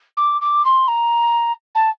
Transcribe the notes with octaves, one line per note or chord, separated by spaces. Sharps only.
D6
D6
C6
A#5
A5